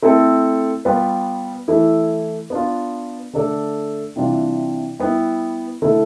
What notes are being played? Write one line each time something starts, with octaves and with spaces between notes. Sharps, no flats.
A3 C4 E4 A4
G3 B3 F4 B4
E3 A3 E4
B3 D4 F4
D3 A3 D4 A4 D5
C3 E3 G3 D4 F4
G3 B3 E4
D3 A3 E4